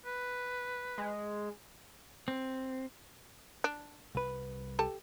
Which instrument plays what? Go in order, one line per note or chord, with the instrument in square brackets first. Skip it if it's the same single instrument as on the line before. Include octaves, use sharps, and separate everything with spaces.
[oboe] B4
[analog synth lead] G#3
[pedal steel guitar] C4
[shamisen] D4
[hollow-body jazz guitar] C2 B4
[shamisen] G4 A4 A5